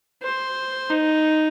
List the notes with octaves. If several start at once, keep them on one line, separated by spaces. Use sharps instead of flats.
C5
D#4